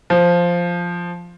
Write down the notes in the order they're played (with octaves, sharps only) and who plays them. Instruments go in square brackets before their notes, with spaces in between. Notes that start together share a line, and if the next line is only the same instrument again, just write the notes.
[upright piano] F3